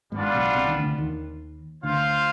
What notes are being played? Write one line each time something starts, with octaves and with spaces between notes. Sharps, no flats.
G#1 G#2 G3 B3 D4 F4
B1 B2
C2 C3
D#3
D2 D3
D#2 D#3
D2 D3 F4 C5 F5